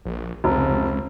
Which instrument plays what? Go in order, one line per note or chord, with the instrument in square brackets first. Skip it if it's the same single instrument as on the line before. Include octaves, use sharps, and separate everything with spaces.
[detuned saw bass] A#1
[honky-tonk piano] F1 [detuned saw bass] C#2